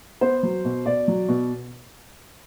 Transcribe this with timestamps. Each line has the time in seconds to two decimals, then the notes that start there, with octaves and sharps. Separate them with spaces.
0.21 B3 C5
0.43 F#3
0.65 B2
0.86 B2 D5
1.08 F#3
1.29 B2